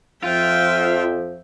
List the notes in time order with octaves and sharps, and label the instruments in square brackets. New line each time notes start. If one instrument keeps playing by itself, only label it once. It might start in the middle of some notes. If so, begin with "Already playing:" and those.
[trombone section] F2 F3 [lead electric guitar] F4 [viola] E5 G5